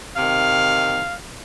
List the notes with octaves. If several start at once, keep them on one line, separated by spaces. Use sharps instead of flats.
C3 D#3 F5